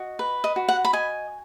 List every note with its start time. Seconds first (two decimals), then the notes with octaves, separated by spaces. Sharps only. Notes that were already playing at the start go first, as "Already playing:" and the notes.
Already playing: F#4 D#5
0.19 B4
0.44 D#5
0.56 F#4
0.68 F#5
0.85 B5
0.93 D#5 G#5